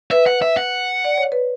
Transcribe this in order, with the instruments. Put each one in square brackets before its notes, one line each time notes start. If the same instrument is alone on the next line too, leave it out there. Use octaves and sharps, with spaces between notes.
[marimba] B4 [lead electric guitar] E5
[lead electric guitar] F#5
E5
F#5
[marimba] D5
C#5
B4